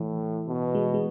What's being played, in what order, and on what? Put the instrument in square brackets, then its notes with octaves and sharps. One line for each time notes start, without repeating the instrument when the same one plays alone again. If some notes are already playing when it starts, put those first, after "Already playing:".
Already playing: [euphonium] A2 [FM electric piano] E3
[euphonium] B2
[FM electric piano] G#3
G#3